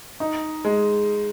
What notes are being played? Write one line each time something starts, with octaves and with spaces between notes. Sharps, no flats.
D#4
G#3